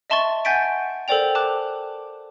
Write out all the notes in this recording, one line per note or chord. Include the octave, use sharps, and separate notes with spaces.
D#5 E5 A5 C6 C#6 A6
F#5 G#5 G6 A6 B6 D7
A4 A#4 C5 D5 G5 F7
A5 D6 F#6